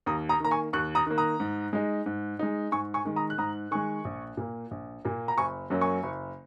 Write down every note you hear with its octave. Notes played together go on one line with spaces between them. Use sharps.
D#2 A#5 D#6
A#5 D#6
D#3 A#3 A#5
G#5 C#6
D#2 C#6 F#6
A#5 D#6
D#3 A#3
A#5 D#6
G#2
G#3 D#4
G#2
G#3 D#4
G#2 G#5 C#6
G#5 C#6
D#3 G#3
A#5 D#6
F#6
G#2 A#5 D#6
D#3 G#3 G#5 C#6
A#1
A#2 A#3
A#1
A#2 A#3
A#5
F#1 G#5 C#6
F#2 F#3 A#3 C#4
G#5 C#6
F#1